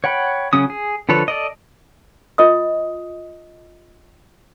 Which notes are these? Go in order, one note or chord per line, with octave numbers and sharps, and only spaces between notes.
C#5 F#5 G5 B5
C#3 F#3 C#4 D#6
G#4
D3 F3 A4 B4 C#5
A4 D5 D#5
F4 D#5 D#6